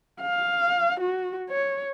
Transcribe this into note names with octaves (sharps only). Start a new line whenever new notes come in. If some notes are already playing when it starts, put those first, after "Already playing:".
F5
F#4
C#5